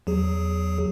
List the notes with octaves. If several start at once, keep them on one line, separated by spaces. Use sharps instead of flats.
E2 F#3 G#4